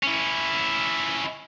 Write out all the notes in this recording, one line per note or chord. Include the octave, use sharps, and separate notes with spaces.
C#4 E4